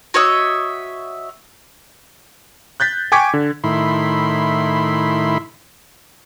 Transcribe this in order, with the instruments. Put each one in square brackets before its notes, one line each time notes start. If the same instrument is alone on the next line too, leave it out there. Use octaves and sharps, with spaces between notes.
[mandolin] F#4 C#5 D#5 E5
[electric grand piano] F#6 G6 A6 B6
G5 G#5 C#6 D6 G#6 B6
D3
[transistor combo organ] A2 D#3 E4 B5 C6